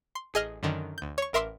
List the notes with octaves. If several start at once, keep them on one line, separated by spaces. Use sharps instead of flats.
C6
A1 G#4 D#5 F6
F#2 D3 D#3
D2 G6
C#5 C#6
A1 A#4 E5 C6 D6 E6